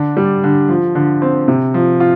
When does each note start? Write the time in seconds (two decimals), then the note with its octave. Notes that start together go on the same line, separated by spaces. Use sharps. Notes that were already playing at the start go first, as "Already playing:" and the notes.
Already playing: D3 D4
0.17 G3
0.44 D3
0.69 F3
0.95 D3
1.22 C4
1.48 C3
1.74 F3
2.00 F4